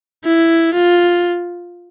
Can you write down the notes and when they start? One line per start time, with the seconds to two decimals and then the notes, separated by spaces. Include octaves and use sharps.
0.24 E4
0.74 F4